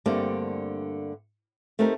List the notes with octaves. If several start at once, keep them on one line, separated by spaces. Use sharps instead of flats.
G2 D3 A3 A#3 C4 G4
A3 C4 D#4 G4 A#4